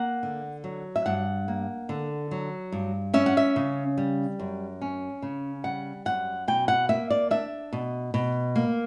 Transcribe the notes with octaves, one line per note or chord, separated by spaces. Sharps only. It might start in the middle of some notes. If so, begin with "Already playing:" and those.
Already playing: A#3 F#5
D3
F#3
E5
G2 F#5
A#3
D3
F#3
G2
C#4 E5
F#5
E5
C#3
G3
F#2
C#4
C#3
G3 F#5
F#2 F#5
B2 G5
F#5
A#3 E5
D5
D4 E5
B2
B2
A#3